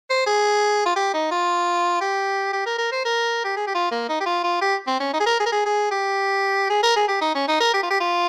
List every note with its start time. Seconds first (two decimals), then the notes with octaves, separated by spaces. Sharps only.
0.10 C5
0.27 G#4
0.86 F4
0.96 G4
1.14 D#4
1.31 F4
2.01 G4
2.53 G4
2.66 A#4
2.78 A#4
2.92 C5
3.05 A#4
3.44 G4
3.57 G#4
3.67 G4
3.74 F4
3.91 A#3
4.09 D#4
4.20 G4
4.26 F4
4.44 F4
4.61 G4
4.87 C4
5.00 C#4
5.13 D#4
5.20 G#4
5.26 A#4
5.40 G#4
5.46 A#4
5.52 G#4
5.66 G#4
5.91 G4
6.70 G#4
6.83 A#4
6.96 G#4
7.08 G4
7.21 D#4
7.35 C#4
7.48 D#4
7.60 A#4
7.74 G4
7.83 F4
7.90 G4
8.00 F4